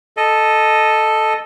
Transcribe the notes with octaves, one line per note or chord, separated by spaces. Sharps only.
A4 D#5